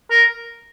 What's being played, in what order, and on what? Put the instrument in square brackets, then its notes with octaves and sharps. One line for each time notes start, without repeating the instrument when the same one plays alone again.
[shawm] A#4